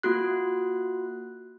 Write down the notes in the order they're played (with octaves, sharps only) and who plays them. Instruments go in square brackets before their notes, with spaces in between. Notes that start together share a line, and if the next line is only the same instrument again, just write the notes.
[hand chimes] A#3 F4 F#4 F#6